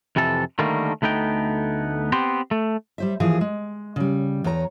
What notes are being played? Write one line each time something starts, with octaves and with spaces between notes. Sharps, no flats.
F2 C3 E3 A4
D3 D#3 G3 A3 A#3
D2 A3 B3 D#4 G5
B3 C4 G4 C5
A3
G3 C5 E5
D#2 E3 F3 G#4 F5
G#3
C#3 G3
E2 C#5 A#5